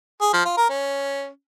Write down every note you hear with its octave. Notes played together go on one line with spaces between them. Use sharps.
G#4
F3
F4
A#4
C#4